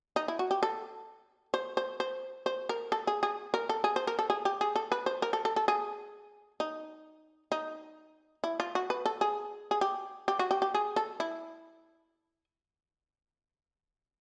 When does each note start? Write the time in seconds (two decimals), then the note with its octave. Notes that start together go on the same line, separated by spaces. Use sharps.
0.16 D#4
0.28 E4
0.39 F#4
0.51 G4
0.63 A4
1.54 C5
1.77 C5
2.00 C5
2.46 C5
2.69 A#4
2.92 A4
3.07 G#4
3.23 G#4
3.54 A#4
3.69 A4
3.84 G#4
3.96 C5
4.07 A#4
4.19 A4
4.30 G#4
4.45 G4
4.61 G#4
4.76 A4
4.92 B4
5.06 C5
5.22 A#4
5.33 A4
5.45 A4
5.56 A4
5.68 G#4
6.60 D#4
7.52 D#4
8.44 E4
8.60 F4
8.75 F#4
8.90 B4
9.06 A4
9.21 G#4
9.71 G#4
9.81 G4
10.28 G4
10.39 F#4
10.51 G4
10.62 G4
10.74 G#4
10.96 A4
11.20 E4